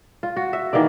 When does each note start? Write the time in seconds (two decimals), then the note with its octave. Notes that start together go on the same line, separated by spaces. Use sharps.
0.23 F4
0.37 F#4
0.53 E5
0.73 D#3 E3 A#3 D5